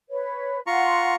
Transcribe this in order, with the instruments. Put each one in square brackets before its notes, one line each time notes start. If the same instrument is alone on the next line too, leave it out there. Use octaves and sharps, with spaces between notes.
[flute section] B4 C#5
[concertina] F4 A#5 C#6 [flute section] F#5 C6